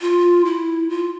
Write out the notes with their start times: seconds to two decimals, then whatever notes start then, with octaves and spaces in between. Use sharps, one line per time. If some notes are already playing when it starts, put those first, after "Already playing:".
0.01 F4
0.45 E4
0.90 F4